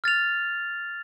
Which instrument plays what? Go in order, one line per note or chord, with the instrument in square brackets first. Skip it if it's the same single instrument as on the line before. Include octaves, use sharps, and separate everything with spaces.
[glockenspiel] F6 A6 F7